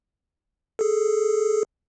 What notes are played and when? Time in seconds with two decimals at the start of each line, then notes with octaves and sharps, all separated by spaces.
0.79 G#4 A4